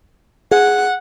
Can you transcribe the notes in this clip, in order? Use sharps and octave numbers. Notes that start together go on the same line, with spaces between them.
G#4 F#5